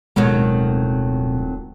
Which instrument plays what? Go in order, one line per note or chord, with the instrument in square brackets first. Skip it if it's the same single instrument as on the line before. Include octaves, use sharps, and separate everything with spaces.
[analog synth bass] D1 [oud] F2 D#3 F#3 [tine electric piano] B2 [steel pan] G#3